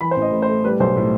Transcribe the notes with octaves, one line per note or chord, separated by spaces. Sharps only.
E3 B5
C5
A1
D#5
A2
C5
A3
G3 B4
B1 C5
A2